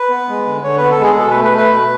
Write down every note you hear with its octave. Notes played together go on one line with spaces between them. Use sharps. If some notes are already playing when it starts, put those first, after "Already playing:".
Already playing: B4
B3
G#3
D3
D3 C#5
B3 B4
A4
G#3 G#4
B2 A4
B4
A3
B4
A3
B4
B2